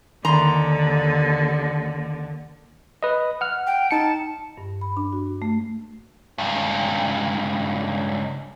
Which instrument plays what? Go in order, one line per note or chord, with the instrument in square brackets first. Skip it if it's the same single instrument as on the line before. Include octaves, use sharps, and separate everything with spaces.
[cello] D#2 D3 [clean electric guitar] D#3 C6 [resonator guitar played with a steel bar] A#5
[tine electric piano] B4 D#5
F#5 F6
[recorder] G5
[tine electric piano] D#4 C#7 [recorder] A5
[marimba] G2
B5
D4
F#4
A3
[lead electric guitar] C#2 G2